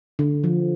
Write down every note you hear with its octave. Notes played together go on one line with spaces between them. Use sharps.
D3
F3